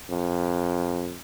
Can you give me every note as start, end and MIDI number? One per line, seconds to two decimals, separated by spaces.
0.10 1.17 41